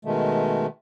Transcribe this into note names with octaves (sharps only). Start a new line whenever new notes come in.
B2 D#3 G#3 A3